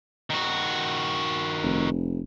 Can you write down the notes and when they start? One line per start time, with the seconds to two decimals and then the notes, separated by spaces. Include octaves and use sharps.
0.30 D#3 F#4
1.63 F1